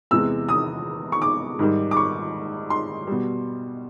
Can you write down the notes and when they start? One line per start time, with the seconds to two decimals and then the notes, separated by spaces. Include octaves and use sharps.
0.11 E2 C3 E3 G#3 E6
0.49 D#6
1.12 C#6
1.22 D6
1.59 G#2 D#3 G3
1.91 D6
1.97 C#6
2.70 C6
3.07 B2 G3